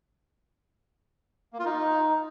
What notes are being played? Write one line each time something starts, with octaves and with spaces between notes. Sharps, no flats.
A#3
F4
D#4